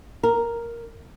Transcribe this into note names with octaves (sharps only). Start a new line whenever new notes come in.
A#4